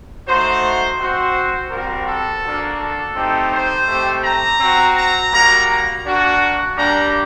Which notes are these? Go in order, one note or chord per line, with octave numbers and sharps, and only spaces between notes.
A3 D#4 F#4 C5
C4 F#4 C5
G3 C4 F#4 A#4
A4
A#3 D4 F#4
A4
A3 C4 D#4 G4
C5
A3 C4 G4
A#5
C4 F#4
A#5
G3 A#3 F#4 A#5
A#3 D4 F#4
G3 A#3 D4 G4 A#5